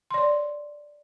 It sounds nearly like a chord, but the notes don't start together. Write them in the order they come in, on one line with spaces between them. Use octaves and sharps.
C6 D5 C#5